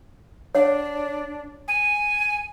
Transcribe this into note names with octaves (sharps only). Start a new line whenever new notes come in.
D4 C#5 F#5
G#5